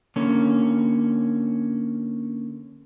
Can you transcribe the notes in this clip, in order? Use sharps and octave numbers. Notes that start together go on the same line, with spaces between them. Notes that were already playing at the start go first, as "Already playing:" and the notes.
D3 A#3 C#4